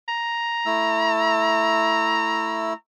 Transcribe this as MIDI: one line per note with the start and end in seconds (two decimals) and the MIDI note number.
0.09 2.74 82
0.66 2.73 57
0.66 2.73 64
0.66 2.73 88